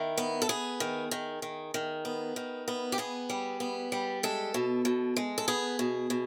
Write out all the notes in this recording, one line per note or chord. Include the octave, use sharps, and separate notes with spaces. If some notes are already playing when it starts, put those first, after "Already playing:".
Already playing: D#3 E4
B3
A4
B3 G#4
D#3
D#3
D#3
D#3
B3
D#3
B3
G4
B3 G#4
G3
B3
G3
G#3 A4
B2
B2
G#3
A4
B3 G#4
B2
B2